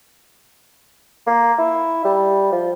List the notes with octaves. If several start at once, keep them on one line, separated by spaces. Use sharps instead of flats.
A#3
E4
G3
F3